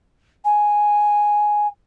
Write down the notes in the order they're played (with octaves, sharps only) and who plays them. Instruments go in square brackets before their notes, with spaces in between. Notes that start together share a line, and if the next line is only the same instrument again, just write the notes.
[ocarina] G#5